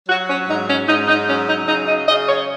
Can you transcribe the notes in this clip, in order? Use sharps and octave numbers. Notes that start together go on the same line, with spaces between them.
F#3 F#4
C#4
G#2 D#4
C#4
G#2 D#4
D#4
F#3 C#4
D#4
C#3 D#4
D#5
C#3 D#5
C#5